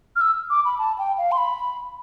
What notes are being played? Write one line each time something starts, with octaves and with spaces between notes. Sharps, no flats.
F6
E6
D6
B5
A5
G5
F5
C6
B5